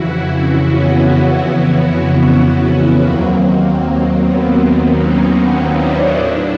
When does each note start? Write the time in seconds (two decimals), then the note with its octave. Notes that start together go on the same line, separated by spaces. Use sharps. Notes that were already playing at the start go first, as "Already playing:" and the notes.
Already playing: F2 C#3 E3 E4 F#4
0.24 E4 F#4
0.64 B3 C#4
2.22 B3
3.00 D#2 D#3 F#3 A#3 C4
3.80 A#3
4.19 B3
4.98 C#4 D#4
5.37 C#4 D#4
5.77 D4 E4
6.16 A2 F#3 D4 E4